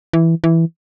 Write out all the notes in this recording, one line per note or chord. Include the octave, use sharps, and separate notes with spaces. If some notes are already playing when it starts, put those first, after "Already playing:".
E3
E3